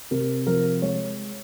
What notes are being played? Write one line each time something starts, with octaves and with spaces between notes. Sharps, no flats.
C3 A#4
F3 A#4
G#3 C#5